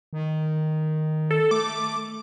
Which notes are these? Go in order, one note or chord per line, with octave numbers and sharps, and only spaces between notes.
D#3
A4
A3 D6